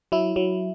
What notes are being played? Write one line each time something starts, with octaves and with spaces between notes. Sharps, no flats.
F#3 E4
F#3